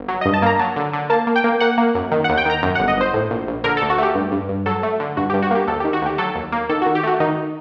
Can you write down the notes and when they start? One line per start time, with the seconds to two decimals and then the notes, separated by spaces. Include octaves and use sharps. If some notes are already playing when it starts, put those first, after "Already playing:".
Already playing: G1
0.08 F#3
0.21 G2 D#5
0.34 A5
0.42 A#3 A#5
0.59 F#3 A5
0.76 D3
0.93 D3
1.10 A#3 A5
1.27 A#3
1.36 G5
1.44 A#3
1.60 A#3 F#5
1.78 A#3
1.95 F#2
2.11 D#3
2.24 F#5
2.29 D#2
2.38 G5
2.45 D#3 A#5
2.63 F#2
2.75 F#5
2.80 G1
2.88 D#5
2.96 G1 C5
3.14 A2
3.30 A#1
3.47 A#1
3.64 D3 A#4
3.77 A4
3.82 D2
3.90 F#4
3.98 A3 G4
4.15 G2
4.32 G2
4.49 G2
4.66 F#3 A4
4.83 A3
5.00 D3
5.17 G2 F#4
5.30 G4
5.34 G2
5.42 F#4
5.51 A#3 G4
5.67 D2 A4
5.80 G4
5.85 D#3
5.93 F#4
6.02 D2 G4
6.18 F#3 A4
6.35 D#2
6.52 A#3
6.69 D#3 A4
6.82 F#4
6.86 D#3
6.95 G4
7.03 A3 F#4
7.20 D#3 D#4